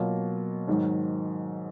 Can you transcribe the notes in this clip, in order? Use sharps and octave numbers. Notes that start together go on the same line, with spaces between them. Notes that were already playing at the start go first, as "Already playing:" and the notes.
Already playing: B2 F#3 A#3 F4
G#2 D#3 F#3